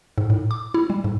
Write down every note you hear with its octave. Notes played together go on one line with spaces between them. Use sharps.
G#2
A2
D6
E4
G3
G#2